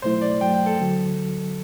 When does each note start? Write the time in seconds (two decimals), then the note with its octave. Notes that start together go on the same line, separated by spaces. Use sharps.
0.02 C2 B2 F#3 A3 E4 C5
0.21 D5
0.41 G2 F#3 A3 G5
0.54 G5
0.66 A4
0.79 D2 D3 F#3